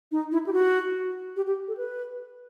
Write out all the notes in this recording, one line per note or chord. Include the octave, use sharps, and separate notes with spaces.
D#4
E4
G4
F#4
G4
G4
A4
B4